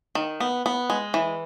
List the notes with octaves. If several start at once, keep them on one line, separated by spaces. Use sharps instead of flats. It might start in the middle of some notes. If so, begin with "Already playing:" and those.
D#3
B3
B3
G#3
E3